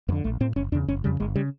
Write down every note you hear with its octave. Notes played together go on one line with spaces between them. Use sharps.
F2 D3 B3
A#1 A3
A2 C4
F#1 C#4
E2 C#3 D4
F#1 C#4
F2 C#3 G3
G1 G#3
C#3 G3